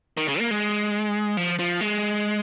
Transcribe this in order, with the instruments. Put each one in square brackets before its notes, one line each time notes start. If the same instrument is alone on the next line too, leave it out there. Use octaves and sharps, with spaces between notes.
[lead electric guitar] D#3
C#3
A#3
G#3
F3
F3
G#3